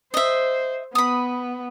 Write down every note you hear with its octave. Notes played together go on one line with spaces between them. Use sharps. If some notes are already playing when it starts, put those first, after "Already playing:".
C5 D#5 E5
B3 B5 D#6